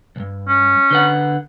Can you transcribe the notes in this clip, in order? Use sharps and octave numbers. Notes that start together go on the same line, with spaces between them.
B1 G2
C#4
D3 B4 F#5